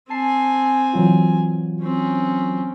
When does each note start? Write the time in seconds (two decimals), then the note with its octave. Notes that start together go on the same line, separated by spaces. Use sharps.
0.10 C4 G#5 A5 C7
0.93 E3 F#3 F4
1.82 C4 C#4